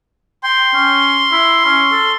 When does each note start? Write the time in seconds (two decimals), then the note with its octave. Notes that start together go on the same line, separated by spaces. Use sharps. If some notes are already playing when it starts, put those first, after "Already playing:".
0.43 G5 C6
0.74 C#4
1.32 E4
1.66 C#4
1.92 A4